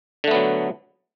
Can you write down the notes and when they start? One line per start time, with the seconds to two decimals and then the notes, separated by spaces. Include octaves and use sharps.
0.24 D3
0.28 A3
0.31 B3
0.35 F#3